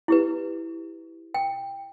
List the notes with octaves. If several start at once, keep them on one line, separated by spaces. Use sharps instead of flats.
E4 G4 B4
G5